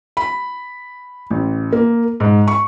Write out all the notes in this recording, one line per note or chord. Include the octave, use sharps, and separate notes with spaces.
B5
A1
A#3
G#2
C#6